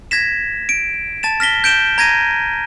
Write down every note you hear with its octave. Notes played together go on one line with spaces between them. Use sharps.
G#6 A#6 B6 E7
D7
A5 A6 E7
F6 A#6 B6 G7
G6 D7 E7 G7
A#5 G#6 A#6 D#7